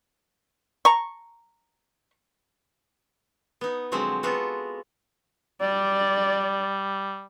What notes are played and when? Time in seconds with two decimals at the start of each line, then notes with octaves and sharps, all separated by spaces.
0.85 A#5 C#6
3.61 B3 D#4
3.92 D3 F3 F#3 G#3 C4
4.23 G#3 B3 F4 F#4 A4
5.61 G3 D5